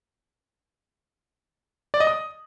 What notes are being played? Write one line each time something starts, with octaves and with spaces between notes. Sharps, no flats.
D5
D#5
D#6